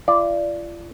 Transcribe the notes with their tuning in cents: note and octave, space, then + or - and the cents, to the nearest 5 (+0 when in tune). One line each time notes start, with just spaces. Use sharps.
F4 -40 D5 +0